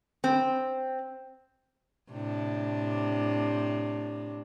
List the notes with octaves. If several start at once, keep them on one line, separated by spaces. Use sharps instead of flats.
C4
A2 C3 D4